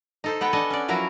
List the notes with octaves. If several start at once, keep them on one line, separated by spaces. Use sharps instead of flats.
D#4 A4 C5
B3 B4 F#5 G5
D4 A4 D#5 G#5 A5
C#4 D5
F3 F#3 E4 F#4 A#4